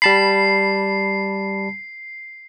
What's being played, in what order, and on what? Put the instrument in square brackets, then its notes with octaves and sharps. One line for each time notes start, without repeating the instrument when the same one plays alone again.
[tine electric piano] G3 A5 B5 [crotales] C7